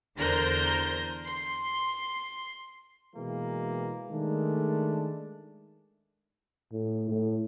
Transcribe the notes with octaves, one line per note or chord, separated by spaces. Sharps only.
E2 D3 A#4 C5 A#5 G6
C6
B2 E3 G#3 A#3
D#3 G#3 A3 D4
A2
A2